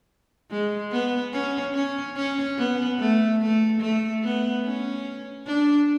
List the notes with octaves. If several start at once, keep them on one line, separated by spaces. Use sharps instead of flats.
G#3
B3
C#4
C#4
C#4
B3
A3
A3
A3
B3
C#4
D4